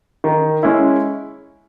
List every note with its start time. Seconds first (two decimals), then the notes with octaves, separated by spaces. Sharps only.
0.24 D#3
0.63 G#3 C#4 E4